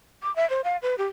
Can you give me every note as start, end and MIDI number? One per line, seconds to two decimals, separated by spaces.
0.23 0.34 86
0.36 0.48 76
0.50 0.61 72
0.64 0.77 77
0.82 0.95 71
0.98 1.06 67